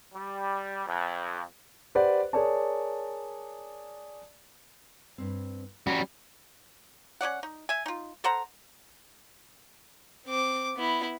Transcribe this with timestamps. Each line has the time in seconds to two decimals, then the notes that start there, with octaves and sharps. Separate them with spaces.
0.14 G3
0.87 F2
1.95 G4 B4 C5 D5 F#5
2.33 G#4 A#4 C#5 D5 A5
5.18 G2 C4
5.87 G3 C#4 F#4
7.21 C#4 D#4 D5 F#5
7.43 D#4
7.69 E5 G#5
7.86 D#4 F4
8.24 A4 C5 F#5 A#5
10.26 C4 D6
10.76 B3 E4